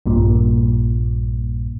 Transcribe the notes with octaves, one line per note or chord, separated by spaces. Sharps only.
A#1 G2 A#2